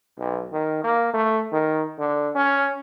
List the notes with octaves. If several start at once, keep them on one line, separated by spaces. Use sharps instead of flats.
B1
D#3
A#3
A3
D#3
D3
C#4